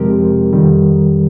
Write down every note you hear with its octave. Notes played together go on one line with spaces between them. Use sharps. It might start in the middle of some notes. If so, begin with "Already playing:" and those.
Already playing: F2 C3 F3 G#3 C4 G4 A#4
F2 D#3 G3